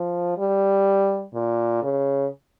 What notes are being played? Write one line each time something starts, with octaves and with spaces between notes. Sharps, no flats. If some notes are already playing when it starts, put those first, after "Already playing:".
Already playing: F3
G3
A#2
C#3